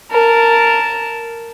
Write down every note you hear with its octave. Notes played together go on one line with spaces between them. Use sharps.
A#4 A5